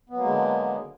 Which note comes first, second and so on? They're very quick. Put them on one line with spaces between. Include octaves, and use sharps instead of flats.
B3 F#3 A#3 G#3 D3